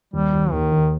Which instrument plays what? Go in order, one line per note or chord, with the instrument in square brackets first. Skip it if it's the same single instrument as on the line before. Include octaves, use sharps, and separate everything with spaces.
[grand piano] D#2 [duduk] G3
[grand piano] D#2
[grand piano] D#2 [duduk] D#3
[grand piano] D#2